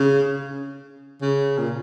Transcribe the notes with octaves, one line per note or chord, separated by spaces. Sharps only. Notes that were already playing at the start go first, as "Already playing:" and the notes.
Already playing: C#3
C#3
A#2